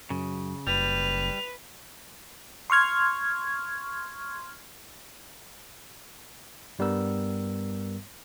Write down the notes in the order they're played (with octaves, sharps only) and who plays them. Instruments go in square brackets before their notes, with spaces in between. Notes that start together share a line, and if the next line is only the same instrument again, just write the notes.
[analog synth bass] F#2 [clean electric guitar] C#3
[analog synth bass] F#1 [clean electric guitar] G3 [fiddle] B4 [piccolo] F7
[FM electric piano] C6 C#6 F6 G#6
[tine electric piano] G2 G3 B3 A#4 E6